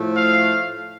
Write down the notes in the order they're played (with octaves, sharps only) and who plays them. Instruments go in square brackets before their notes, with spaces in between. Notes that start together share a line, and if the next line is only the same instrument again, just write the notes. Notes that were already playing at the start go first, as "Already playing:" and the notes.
Already playing: [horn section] A2 F3 A3
[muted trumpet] F5